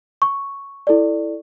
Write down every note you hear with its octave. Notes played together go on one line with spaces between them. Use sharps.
C#6
E4 A4 D5